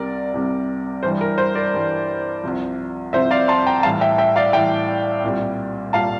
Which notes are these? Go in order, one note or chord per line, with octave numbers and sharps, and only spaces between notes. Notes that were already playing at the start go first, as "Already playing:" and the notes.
Already playing: C2 C3 G3 A#4 D5
C2 C3 G3
G2 E3 G3 C5
A#4
C5
A#4 D5
G2 E3 G3
C2 C3 F3
C2 C3 F3 C5 E5
D5 F5
A5 C6
G5 A#5
A2 E3 G3 F5 A5
E5 G5
E5 G5
D5 F5
A2 E3 G3 E5 G5
C2 A#2 G3
A#2 G3 F5 A5